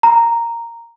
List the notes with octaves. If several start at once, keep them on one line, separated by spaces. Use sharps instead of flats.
A#5